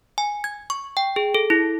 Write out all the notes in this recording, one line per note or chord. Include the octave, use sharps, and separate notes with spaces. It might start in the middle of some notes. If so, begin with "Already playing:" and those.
G#5
G#6
C#6
G5
G#4
A4
E4